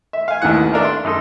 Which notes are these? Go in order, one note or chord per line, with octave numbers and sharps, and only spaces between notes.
E5
F5 G#5
A1 D#2 D#3 E3 F#5
A3 D4 A#4 F5
C6
F#2 D#4 A4 C6